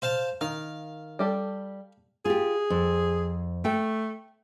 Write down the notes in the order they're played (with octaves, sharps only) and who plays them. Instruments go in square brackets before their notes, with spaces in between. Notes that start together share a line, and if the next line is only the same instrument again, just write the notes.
[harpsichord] C5 F5 A5
[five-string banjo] D#3 [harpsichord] F5
[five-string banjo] G3 G4 A4
[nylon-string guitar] F4 G4 [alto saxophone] G#4
[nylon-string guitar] F2
[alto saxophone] A3 [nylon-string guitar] G5